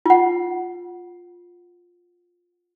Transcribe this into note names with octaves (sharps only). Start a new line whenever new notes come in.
F4 F#5